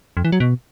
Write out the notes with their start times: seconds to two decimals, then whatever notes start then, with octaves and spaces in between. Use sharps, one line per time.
0.17 F2
0.25 E3
0.32 F#3
0.40 B2